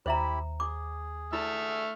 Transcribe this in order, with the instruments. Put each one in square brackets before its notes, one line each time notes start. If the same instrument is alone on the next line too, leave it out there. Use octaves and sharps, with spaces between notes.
[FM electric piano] D#2 [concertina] E4 G4 B5 [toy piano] C5 E5 A#5
[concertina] G#4 [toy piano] D6
[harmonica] A3 E6 F6 [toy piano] E4